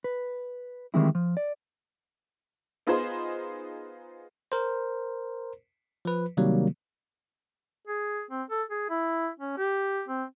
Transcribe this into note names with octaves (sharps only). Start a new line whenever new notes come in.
B4
D#3 E3 G3 G#3 C4 E4
F3
D5
B3 D#4 F4 G#4 B4 C5
A#4 C5
F3 B4
C3 D#3 F#3 G3 A#3
G#4
C4
A4
G#4
E4
C#4
G4
C4